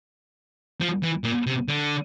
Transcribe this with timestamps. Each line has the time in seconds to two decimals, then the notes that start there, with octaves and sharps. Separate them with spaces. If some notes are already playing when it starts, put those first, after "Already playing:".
0.81 F3
1.03 E3
1.24 A#2
1.47 C3
1.68 D3